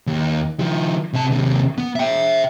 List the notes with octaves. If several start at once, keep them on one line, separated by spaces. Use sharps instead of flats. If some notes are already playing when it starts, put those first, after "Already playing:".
D#2
D#3 F3
C3 A5
D#2 C3
B3
E5 G5